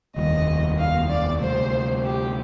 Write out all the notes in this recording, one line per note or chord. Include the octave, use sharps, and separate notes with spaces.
F1 D#2 D#3 G3 D#5
F5
D5
D2 C3 G3 C5
G4